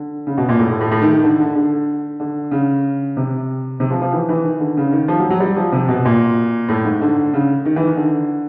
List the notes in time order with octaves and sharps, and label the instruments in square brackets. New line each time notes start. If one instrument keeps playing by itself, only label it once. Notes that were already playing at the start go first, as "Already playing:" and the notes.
Already playing: [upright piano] D3
C#3
B2
A#2
A2
A2
A2
A2
D#3
D#3
D3
D3
D3
D3
C#3
C3
C3
F3
F3
E3
E3
D#3
D3
C#3
D#3
F3
F#3
F#3
G3
F3
C3
B2
A#2
A2
G#2
D3
C#3
D#3
E3
D#3
D3